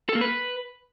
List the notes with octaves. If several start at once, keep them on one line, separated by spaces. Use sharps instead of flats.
A4
A#3
B4